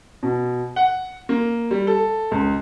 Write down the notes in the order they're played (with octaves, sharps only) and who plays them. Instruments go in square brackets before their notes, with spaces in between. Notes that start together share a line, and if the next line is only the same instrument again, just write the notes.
[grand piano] B2
F#5
A#3
G3
A4
C#2